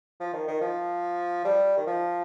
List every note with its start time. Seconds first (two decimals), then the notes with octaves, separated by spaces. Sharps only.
0.20 F3
0.33 D#3
0.48 D#3
0.61 F3
1.45 G3
1.77 D#3
1.87 F3